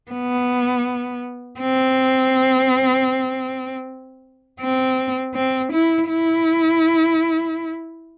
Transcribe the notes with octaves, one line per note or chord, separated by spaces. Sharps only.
B3
C4
C4
C4
E4
E4